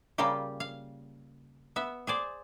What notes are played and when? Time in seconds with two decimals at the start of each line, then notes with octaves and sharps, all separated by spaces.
0.18 C#3 G3 A#3 F4 G4
0.60 F5
1.76 B3 E5
2.07 G#4 C5 D5